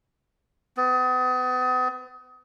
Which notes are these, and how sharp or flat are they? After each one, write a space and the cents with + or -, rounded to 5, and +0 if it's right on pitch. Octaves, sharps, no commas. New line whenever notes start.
B3 +40